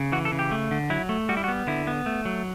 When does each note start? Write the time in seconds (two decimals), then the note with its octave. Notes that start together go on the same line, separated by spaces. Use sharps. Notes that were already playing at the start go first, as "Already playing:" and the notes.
Already playing: C#3
0.12 E3 F#4
0.25 A4
0.32 C#3
0.39 G4
0.51 A3
0.71 D3
0.90 F#3 E4
1.09 A3
1.29 G3 F#4
1.37 E4
1.44 F#4
1.48 B3
1.67 D3 E4
1.87 B3
2.06 A3
2.25 F#3